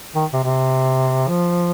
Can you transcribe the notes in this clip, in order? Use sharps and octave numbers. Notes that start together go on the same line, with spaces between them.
D#3
C3
C3
F3